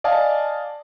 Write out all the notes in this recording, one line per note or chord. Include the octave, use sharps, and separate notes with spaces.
D5 D#5 F5 G#5 A5